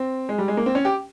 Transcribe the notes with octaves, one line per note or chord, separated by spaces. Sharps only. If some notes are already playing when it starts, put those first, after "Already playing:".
Already playing: C4
G#3
G3
G#3
A#3
C4
C#4
G4